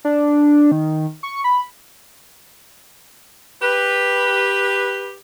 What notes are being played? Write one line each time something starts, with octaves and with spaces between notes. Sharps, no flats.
D4
D#3
C#6
B5
G4 B4